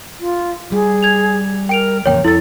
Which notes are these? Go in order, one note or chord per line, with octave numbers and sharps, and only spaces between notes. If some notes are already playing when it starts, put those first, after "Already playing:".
F4
G3 G#4
G#6 F7
A#4 G5 D7 F7
A1 F2 C#3 A#3 C#5 G5
F2 E4 A4 A6